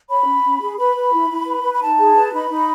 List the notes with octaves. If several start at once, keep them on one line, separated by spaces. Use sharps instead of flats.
C#5 B5
C#4
C#4
G#4
B4 B5
B4
E4
E4
B4
B4
B5
D#4 A5
G#4
B4
D#4 B5
D#4